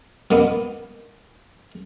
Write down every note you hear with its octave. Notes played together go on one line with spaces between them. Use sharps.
B2 A#3 B3